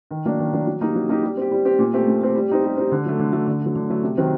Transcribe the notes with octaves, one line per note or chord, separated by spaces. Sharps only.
D#3
F#3 A#3 D4
D#3
F#3 A#3 D4
F#3
A#3 D#4 G4
F#3
A#3 D#4 G4
G3
C4 G4
G3
C4 G4
A#2
A3 C4 G4
A#2
A3 C4 G4
G3
C4 D#4 G4
G3
C4 D#4 G4
D3
F#3 A3
D3
F#3 A3
D3
F#3 A3
D3
F#3 A3
C3
D#3 F#3 C4